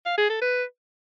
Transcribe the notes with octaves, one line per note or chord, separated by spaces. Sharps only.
F5
G#4
A4
B4